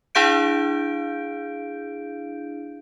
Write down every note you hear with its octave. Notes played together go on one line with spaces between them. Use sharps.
D4 E4 G#4 F5 G6 D7